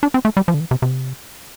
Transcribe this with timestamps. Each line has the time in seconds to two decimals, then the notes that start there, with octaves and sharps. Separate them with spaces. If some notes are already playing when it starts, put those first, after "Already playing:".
0.03 D4
0.14 C4
0.25 A3
0.37 G3
0.48 F3
0.54 D3
0.60 E3
0.71 C3
0.82 C3